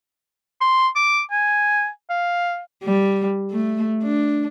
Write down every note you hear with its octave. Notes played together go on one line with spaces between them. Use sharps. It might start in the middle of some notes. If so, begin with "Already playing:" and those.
C6
D6
G#5
F5
G3
A3
D4